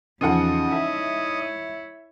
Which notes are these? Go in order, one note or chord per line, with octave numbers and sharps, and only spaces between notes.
E2 C#3 F3 D#4 D#5 F#5 A5
E4 C#5 E5